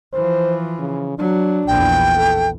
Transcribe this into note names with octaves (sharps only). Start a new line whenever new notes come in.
E3 F3 C5
C#3
F#3 D4
A#1 E2 G5
A4